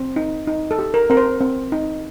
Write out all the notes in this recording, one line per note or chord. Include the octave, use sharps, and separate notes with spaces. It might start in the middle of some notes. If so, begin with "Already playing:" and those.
Already playing: C4
D#4
D#4
A4
G4
A#4
C4 A#4
C5
C4
D#4